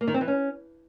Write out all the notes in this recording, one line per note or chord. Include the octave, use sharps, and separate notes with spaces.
A#3
D#3
C4
E3
C#4